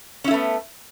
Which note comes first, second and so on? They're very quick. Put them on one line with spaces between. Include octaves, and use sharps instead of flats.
C#4 E4 A3 B3